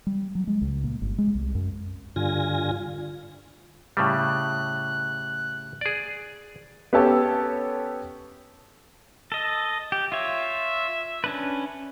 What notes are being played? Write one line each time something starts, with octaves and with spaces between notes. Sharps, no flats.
G3
F#3
G#3
C#2
A#2
G1
G#3
C2
F#2
G2 D3 F4 G#5 A#6
A2 C#3 G3 F#6
G#4 D5
B3 C#4 G4 A4 C#5 A5
A4 D#5
G4
F4 C#5 E5
C#4 D4 B4